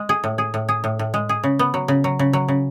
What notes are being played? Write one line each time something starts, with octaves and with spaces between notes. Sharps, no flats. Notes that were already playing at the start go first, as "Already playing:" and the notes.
Already playing: G#3
G#4
A2
G#4
A2
G#4
A2
A2
G#3
G#4
C#3
B3
F#3
C#3
F#3
C#3
F#3
C#3